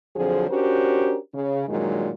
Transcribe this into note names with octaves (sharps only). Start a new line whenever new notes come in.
F2 D3 F3 F#3 C4 G#4
C#4 D4 F#4 G4 A#4 C5
C#3
G2 A#2 D#3 F#3 G#3